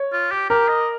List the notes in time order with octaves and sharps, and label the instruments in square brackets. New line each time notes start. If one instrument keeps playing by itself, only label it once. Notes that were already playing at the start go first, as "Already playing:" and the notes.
Already playing: [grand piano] C#5
[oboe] F4
G4
[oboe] G4 [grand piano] A#4
[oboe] D#5